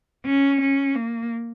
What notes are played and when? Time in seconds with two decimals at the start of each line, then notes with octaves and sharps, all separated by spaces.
0.25 C#4
0.61 C#4
0.95 A#3